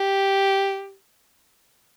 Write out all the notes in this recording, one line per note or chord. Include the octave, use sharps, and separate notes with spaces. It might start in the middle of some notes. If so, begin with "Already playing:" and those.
Already playing: G4